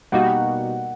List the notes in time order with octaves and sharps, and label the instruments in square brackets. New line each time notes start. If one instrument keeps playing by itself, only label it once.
[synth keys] B2 G3 A#3 D#4 F#4 [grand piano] F#5